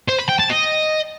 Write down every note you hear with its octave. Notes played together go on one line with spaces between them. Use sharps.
C5
B5
G5
A5
D#5